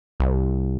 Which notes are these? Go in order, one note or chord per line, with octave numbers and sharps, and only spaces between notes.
C2